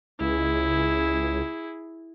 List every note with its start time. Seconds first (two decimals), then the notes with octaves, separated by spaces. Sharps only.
0.20 C#2 E4 G#4